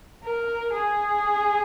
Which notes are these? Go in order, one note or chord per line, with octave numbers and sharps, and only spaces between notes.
A#4
G#4